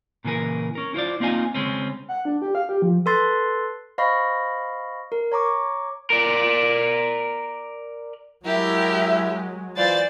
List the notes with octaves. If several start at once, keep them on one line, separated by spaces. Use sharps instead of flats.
A#2 C#3 E3 G#4 A#4
C#4 A#4
E4 F4 C5 D5
A#3 C4 D#4 F4 G#5
C#3 G#3 C4 C#4
F#5
D4
G4
F5
G4
F3
A4 B4 C6 A6 C7
C5 D#5 F5 B5 C#6 A#6
A#4
C#5 A#5 C#6 D6
A#4 D5
F#3 G#3 E4 G4 A#4
E3 F4 C5 D5 A6